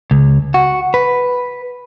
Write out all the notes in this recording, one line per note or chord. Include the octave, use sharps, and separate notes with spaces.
C#2
F#4
B4